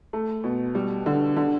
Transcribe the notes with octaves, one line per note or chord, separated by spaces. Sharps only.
A3
B2
G3
D3
D3